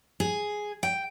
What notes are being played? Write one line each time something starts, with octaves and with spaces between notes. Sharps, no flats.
G#4
G5